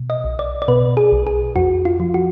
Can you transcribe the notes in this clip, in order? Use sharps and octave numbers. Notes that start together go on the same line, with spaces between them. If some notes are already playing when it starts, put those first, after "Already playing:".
Already playing: B2
D#5
B1
D5
D5
B2 B4
G#4
B1
G#4
F2 F#4
F4
F3
F#4